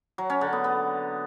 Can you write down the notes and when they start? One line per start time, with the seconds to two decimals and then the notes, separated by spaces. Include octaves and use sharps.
0.18 F#3
0.30 C#4
0.41 D3
0.53 B3
0.64 B3